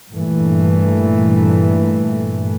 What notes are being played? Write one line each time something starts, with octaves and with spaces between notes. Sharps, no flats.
G2 A#2 E3 A3